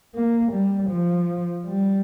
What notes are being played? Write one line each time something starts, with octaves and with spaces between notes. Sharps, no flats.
A#3
G3
F3
G3